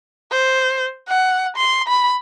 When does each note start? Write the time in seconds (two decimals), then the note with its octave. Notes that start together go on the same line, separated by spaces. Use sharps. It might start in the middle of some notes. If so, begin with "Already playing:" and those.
0.32 C5
1.08 F#5
1.56 C6
1.88 B5